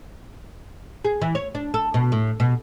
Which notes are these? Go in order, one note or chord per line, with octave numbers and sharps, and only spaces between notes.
G#4
E3
C#5
D4
A4
B2
A2
B2